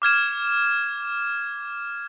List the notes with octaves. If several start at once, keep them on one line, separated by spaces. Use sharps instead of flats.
D6 F6 G#6 E7